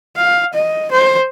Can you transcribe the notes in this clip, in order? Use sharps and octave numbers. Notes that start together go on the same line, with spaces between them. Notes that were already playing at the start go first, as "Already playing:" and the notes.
F5
D#5
C5